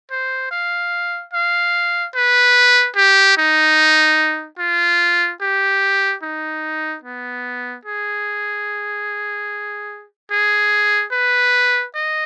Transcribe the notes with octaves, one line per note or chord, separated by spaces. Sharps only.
C5
F5
F5
B4
G4
D#4
F4
G4
D#4
B3
G#4
G#4
B4
D#5